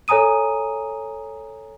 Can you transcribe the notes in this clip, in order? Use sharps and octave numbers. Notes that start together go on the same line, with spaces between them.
A4 C#5 G#5 A#5 D#6 D#7